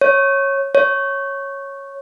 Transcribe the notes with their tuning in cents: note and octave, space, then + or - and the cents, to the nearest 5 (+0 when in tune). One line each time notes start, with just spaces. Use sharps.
C#5 -10
C#5 -5